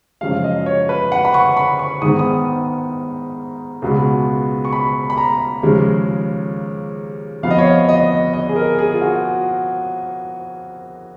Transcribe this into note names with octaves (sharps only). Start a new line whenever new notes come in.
F#2 C#3 F3 G#3 F5
F5
D#5
C#5
B4
F#5
B5
C#6
B5
C#6
G#2 D#3 G#3 B3 D#6
D#6
C#2 B2 G#3 B3
C#6
B5
B5
A#5
D#2 C#3 F3 G#3
F2 F3 B3 F5
D#5
C#5
D#5
D#5
D#5
G#4
A#4
G#4
F4
F#4